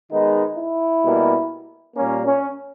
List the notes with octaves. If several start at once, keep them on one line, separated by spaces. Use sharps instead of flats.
D#3 G#3 B3 D#4
E4
B2 G3 A#3
A#2 G3 A#3 C#4
C#4